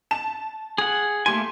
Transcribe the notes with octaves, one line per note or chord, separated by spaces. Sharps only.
A5 E7
G#4 F#5
A3 A#3 G4 G#5 C6